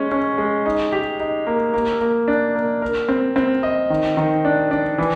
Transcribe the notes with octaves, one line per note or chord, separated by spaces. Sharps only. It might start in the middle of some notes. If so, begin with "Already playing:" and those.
Already playing: G#3 C#4
C#4
G#3
D#4
G4
D#4
A#3
A#3
A#3
D4
A#3
A#4
C4
C4
D#5
D#3
D#3
D4
D4
E3